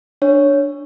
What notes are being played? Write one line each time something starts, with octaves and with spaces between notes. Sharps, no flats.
D4 C#5